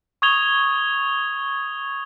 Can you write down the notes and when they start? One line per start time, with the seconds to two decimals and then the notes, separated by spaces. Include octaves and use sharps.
0.22 C#6 D#6 G#6 F7 G7